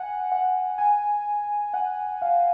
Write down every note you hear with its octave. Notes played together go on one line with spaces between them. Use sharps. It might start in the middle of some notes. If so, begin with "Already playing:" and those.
Already playing: F#5 G#5
F#5
G#5
F#5
F5